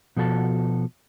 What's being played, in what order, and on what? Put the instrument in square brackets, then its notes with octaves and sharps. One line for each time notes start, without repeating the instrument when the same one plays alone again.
[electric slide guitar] B2 F3 F#4 A4 G#5 A5